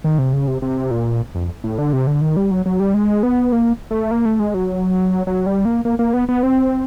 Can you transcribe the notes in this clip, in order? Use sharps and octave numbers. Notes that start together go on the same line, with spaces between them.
D#3
C3
C#3
C3
C3
A#2
F2
A2
D3
C3
D3
D#3
G3
F#3
F#3
G3
G#3
B3
A#3
A3
A#3
A3
G#3
F#3
F#3
G3
A#3
A#3
A#3
B3
B3
C4